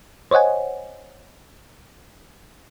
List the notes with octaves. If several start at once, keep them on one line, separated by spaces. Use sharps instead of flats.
C5 C#5 D#5 F#5 G#5